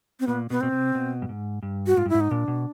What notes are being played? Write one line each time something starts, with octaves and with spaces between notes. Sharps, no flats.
C4
A#2 B3
B2 B3
B2 C4
C3
B2
G2
G#2
G2
F#4
G#2 F4
G2
E4
G#2
D#4
A#2 D4
B2